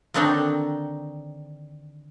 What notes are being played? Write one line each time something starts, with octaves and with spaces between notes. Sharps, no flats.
D3 D#3 C4 D4 D#4 C#5